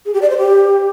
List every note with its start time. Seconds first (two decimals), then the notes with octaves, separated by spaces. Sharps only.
0.06 G#4
0.14 G4
0.22 D5
0.30 C5
0.38 G4